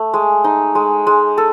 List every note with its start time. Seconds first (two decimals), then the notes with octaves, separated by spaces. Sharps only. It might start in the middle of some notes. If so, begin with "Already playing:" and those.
Already playing: A3
0.14 G#3
0.44 D#4
0.75 G#3
1.07 G#3
1.38 A4